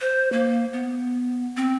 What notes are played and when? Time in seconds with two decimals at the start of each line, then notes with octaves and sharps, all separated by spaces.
0.01 C5
0.32 A#3
0.73 B3
1.57 C4